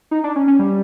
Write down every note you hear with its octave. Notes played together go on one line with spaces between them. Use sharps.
D#4
D4
C#4
C#4
G3